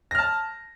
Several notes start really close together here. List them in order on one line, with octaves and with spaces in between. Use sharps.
A#6 F6 A5